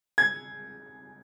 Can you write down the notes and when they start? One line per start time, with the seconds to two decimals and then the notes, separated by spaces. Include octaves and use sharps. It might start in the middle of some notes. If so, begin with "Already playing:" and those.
0.18 G#6